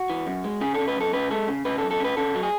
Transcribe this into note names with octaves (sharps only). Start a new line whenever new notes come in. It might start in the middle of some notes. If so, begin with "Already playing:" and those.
Already playing: F#4
E3
F#2
G#3
C#3 G#4
C#3 A4
B4
F#2 A4
C#3 B4
G#3 A4
C#3
C#3 B4
A4
F#2
A4
C#3 B4
C#3 A4
F#3
G#4